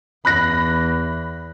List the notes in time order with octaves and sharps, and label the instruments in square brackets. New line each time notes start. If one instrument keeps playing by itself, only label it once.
[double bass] E2 [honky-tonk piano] B5 F#6 A#6